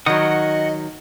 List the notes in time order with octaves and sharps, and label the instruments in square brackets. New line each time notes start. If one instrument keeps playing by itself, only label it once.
[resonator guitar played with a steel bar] D#3 F#3 [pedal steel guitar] F#4 F#5 D#6 [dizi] D#5